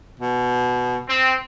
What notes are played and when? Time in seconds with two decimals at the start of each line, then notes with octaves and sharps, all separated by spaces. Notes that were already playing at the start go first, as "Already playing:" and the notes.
0.20 B2
1.08 C4